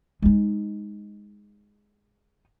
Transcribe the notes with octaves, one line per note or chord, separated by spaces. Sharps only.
G#3 D#4